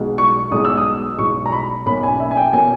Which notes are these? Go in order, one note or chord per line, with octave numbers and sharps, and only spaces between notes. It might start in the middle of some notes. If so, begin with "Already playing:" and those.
Already playing: B1 B2 G#3
C#6
B1 B2 G#3 D#6
E6
D#6
B1 B2 G#3 C#6
A#5
B5
B1 B2 A#3 C#4 B5
G#5
E5
G#5
G5
B2 A#3 C#4 G#5